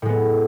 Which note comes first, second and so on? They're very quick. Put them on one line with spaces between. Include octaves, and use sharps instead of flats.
A2 G#3 B3